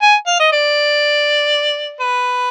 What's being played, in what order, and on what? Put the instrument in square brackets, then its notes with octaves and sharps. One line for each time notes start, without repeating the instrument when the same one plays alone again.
[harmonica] G#5
F5
D#5
D5
B4